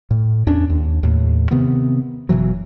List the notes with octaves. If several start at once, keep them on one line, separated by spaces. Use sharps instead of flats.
A2
E2 C#4 D4
D#2
D#2 A2
C3 D#3 B3 C4
F#1 B2 E3 F#3